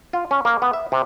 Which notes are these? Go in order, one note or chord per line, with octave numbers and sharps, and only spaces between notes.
F4
C#4
A#3
B3
E5
C3